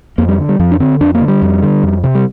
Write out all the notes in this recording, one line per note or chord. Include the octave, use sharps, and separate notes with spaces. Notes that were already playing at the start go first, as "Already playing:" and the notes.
F2 A#3
G3
D3
G3
F2 F3
D4
D3 C4
F2 D4
A#3
D3
G3
F2
D3
F2
C3
G3